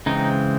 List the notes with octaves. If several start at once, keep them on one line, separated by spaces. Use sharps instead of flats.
C#3 E3 G#3 C4 D#4